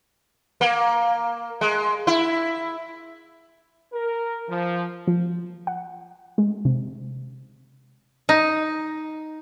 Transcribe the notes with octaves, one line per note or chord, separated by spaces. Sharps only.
A#3
G#3
E4
A#4
F3
F3
F#5
G#3
C3
D#4